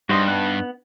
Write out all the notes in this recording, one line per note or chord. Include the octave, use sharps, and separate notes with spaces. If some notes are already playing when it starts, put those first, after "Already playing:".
G2 G3 D4 D#4 F#4 C5 D#5 C6
B3 F#6